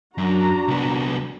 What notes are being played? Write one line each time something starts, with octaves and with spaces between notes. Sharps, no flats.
F#2 D4 F#4 A#5
C2 B3